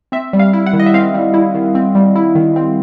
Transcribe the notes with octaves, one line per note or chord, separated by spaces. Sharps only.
C4 E5
G3
F5
E4
F#5
D#3
D#5
E5
C4 F5
G3
E4
D#3
C4
G3
E4
D#3
C4